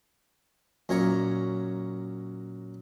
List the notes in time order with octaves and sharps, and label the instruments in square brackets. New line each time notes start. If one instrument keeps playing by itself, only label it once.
[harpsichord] F#2 A#2 C#5 G#5 A#5 C#6